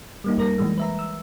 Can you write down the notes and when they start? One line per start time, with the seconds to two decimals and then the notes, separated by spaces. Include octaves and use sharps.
0.24 G3 A#3 D#4
0.37 F2 G3 A#4 A#6
0.58 B2 E3 G#3 A3
0.78 B4 E5 A#5
0.99 E6